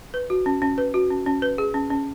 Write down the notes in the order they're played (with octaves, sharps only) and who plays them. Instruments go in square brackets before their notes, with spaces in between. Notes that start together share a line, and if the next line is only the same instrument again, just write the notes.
[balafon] B4
F#4
C#4
C#4
B4
F#4
C#4
C#4
B4
G#4
C#4
C#4